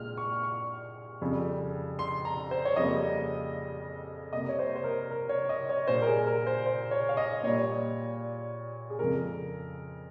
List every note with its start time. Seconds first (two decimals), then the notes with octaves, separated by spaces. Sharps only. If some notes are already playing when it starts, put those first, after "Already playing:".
Already playing: A#2 G#3 F6
0.17 C#6
0.43 C#6
1.22 F2 C#3 G3
1.99 C6
2.25 A#5
2.51 C5
2.65 C#5
2.76 F2 C#3 G3 A#3 D#5
4.33 C3 G3 A#3 D#5
4.49 C#5
4.59 C5
4.76 C5
4.84 A#4
5.11 A#4
5.29 C#5
5.49 D#5
5.69 C#5
5.87 A#2 G3 A#3 C5
6.02 A#4
6.07 G#4
6.27 A#4
6.47 C5
6.66 C5
6.91 C#5
7.09 F5
7.17 D#5
7.43 A#2 G3 A#3 C#5
8.90 G#4
8.99 F2 C#3 G#3 A#4